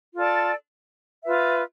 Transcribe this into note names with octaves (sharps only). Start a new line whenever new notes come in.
F4 A4 D5 A5
F4 B4 E5